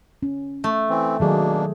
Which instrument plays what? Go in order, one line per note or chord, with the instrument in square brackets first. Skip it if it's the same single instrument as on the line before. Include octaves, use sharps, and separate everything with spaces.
[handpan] C#4
[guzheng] A3
[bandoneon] E3 C4
[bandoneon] B2 A#3 D4 [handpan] D#3 F#3 G#4